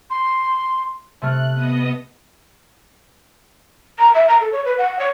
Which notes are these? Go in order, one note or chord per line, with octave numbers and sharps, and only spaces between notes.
C6
C3 A3 F6 F#6
B3 D#5 D#6
A#5
E5
A#5
A4
C#5
B4
F#5
C#5